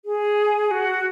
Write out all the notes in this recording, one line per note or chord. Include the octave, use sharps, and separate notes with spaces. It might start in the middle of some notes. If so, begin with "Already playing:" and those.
G#4
F#4